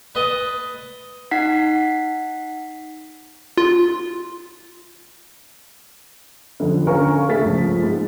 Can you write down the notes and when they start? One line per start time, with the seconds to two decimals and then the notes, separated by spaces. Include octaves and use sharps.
0.15 B4 D#5 A5
1.31 D#4 F#5 B6 C7
3.58 F4
6.60 F2 D3
6.87 D3 C#4 A#4 F5 G#5 C#6
7.29 C#3 A3 E5 A6 B6
7.45 C#2 F3
7.83 G#2